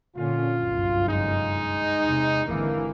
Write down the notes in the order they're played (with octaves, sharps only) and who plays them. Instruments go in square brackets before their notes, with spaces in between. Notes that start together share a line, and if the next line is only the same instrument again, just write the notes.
[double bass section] A#2 D3 C#4 [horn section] F4
[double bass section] G1 C2 F#2
[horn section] G#3 D#4
[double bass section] E2 C3
[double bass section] G#1 D3 E3 [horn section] A#3